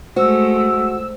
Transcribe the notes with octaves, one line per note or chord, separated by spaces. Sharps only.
G#3 A3 F#4 C5 E6